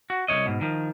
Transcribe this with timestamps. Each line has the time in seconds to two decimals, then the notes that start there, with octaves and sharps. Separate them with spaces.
0.10 F#4
0.28 C2 C#3 C#5 D#5
0.46 G#2 B2
0.61 D#3 F3